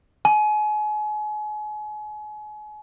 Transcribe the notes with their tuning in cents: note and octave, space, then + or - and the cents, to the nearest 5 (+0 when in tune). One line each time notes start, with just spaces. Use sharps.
G#5 +35